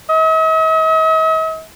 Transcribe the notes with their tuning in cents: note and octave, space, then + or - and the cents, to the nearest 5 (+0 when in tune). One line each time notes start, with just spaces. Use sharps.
D#5 +45